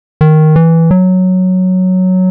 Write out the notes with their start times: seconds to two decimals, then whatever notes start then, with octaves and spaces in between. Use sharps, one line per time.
0.21 D#3
0.56 E3
0.91 F#3